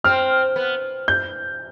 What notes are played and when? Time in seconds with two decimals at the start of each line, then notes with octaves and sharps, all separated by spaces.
0.04 C4 F6
0.56 B3
1.08 G6